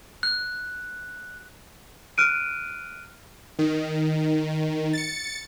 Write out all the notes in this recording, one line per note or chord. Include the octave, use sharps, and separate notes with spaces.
F#6
F6 F#6 D7 D#7
D#3
A6 C#7